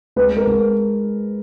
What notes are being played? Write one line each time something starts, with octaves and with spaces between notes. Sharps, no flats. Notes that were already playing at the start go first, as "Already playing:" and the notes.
G#3 B4
A#4
G#3